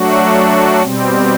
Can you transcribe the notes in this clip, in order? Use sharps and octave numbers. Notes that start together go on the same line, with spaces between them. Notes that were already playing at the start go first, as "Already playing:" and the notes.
Already playing: F#3 A3 D4 F#4
B2 G3 C4